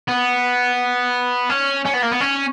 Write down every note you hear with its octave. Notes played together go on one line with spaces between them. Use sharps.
B3
C#4
C#4
B3
A#3
B3
C#4